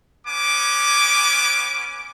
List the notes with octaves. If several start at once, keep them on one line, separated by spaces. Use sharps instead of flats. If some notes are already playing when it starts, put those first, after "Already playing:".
B3 C#4 G#5 D6